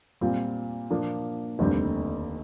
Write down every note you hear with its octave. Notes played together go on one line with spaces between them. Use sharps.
A#2 G3 C4 F4
A#2 F3 A#3 D4
F1 D#2 D3 G3 C4